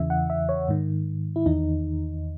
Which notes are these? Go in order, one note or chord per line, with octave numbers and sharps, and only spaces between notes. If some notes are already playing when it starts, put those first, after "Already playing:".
Already playing: E2 C#3 E3 E5
F#5
E5
C#5
G#2 D#3
E4
E2 D#3 D#4